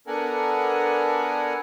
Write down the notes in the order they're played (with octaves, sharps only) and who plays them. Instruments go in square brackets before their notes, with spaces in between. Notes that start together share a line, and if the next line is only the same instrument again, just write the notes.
[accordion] B3 D4 A4 A#4 F#5 G#5